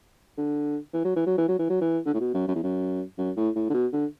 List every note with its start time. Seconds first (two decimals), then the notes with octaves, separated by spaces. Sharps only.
0.38 D3
0.94 E3
1.05 F#3
1.16 E3
1.26 F#3
1.38 E3
1.48 F#3
1.59 E3
1.70 F#3
1.81 E3
2.06 D3
2.14 A2
2.20 B2
2.34 F#2
2.48 F#2
2.55 E2
2.63 F#2
3.18 F#2
3.37 A2
3.55 A2
3.70 D3
3.74 B2
3.93 D3